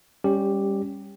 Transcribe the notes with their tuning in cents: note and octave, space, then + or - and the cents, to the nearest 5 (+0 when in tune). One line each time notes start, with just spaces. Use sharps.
G3 +25 C#4 +0 G4 +0